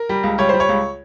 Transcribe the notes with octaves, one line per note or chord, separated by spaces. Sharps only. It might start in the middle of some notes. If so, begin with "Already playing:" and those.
Already playing: A#4
G3
C#2
G3 C#5
G3 C5
C#5
C#2